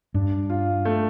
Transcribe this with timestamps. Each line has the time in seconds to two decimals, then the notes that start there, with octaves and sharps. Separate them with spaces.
0.14 G2 D4
0.50 F4
0.85 A3